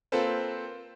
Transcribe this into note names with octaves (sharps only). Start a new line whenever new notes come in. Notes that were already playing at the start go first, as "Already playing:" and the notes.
A#3 C4 F4 A4 B4 C5